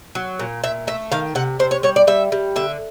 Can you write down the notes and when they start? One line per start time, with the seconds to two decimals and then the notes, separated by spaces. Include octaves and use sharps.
0.15 F#3
0.39 A#2
0.64 A#2 E5
0.87 A3 E5
1.12 D#3 F5
1.35 C3 F#5
1.59 C3 C5
1.71 C#5
1.83 G3 C#5
1.96 D5
2.07 G3 E5
2.32 G3
2.56 D3 E5